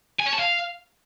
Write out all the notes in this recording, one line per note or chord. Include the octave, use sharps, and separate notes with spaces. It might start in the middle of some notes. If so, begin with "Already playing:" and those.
G#5
C#5
A5
F5